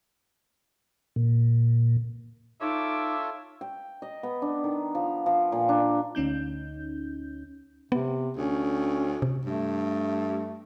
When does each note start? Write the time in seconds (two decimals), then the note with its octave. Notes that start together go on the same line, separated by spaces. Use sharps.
1.16 A#2
2.61 D#4 F4 A4 C#5 E5 D6
3.61 G5
4.02 D#5
4.23 B3
4.42 D4
4.64 D#3
4.95 F3
5.26 F3
5.52 A#2
5.69 D4
6.15 D2 C#4 D#4 G6
7.92 C3 B3
8.37 D2 C#4
9.22 C3
9.45 G2 A3